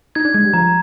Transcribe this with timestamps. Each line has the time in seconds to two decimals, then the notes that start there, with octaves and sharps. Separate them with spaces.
0.15 D#4 G#6
0.25 D4
0.34 G#3 G#6
0.44 G3
0.54 F3 A#5